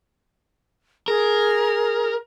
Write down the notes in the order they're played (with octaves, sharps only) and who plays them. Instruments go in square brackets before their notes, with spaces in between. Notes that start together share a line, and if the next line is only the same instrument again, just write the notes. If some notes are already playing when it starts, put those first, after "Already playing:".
[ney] G#4 [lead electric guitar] A#4